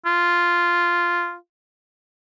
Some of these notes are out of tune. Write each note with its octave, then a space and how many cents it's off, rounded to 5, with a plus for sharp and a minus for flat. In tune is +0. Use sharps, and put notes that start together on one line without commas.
F4 -5